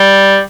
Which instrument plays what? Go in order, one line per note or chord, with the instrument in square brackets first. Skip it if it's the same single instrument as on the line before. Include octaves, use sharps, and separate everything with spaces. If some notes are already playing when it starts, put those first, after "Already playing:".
Already playing: [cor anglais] G3